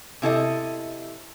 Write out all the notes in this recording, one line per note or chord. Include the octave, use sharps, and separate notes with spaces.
C3 E4 A4 D#5